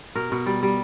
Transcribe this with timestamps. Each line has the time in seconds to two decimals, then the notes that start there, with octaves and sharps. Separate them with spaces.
0.15 B2 A#4
0.32 B2
0.46 G3
0.63 G3